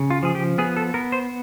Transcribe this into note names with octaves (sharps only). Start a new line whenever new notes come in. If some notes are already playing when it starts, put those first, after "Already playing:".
Already playing: C#3
F4
F3 G#4
G4
B3 G#4
A4
B3 A#4
C5